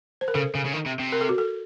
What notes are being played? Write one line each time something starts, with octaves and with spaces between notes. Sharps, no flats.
C5
A#4
C#3 A4
C#3
C#3
D#3
C3
C3
A#4
A4
F#4
A4